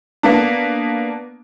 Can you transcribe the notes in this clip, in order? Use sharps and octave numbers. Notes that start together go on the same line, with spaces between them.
A#3 B3 D4